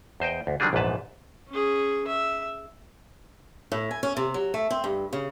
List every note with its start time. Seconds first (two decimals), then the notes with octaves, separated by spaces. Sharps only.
0.20 E2 C5 D#5 G5
0.47 D2
0.60 D3 D#3 F#3 G3 D4 G#4
0.73 A#1 E2 G#2 B4 A5
1.49 C#4 G#4
2.07 E5
3.72 A2
3.91 G#5
4.03 C#4
4.17 C3
4.34 F#3
4.54 A3
4.71 C4
4.84 G2
5.13 C#3